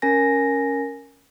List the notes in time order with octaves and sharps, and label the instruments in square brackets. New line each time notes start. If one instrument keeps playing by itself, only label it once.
[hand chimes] C#4 A#4 G#5 A#6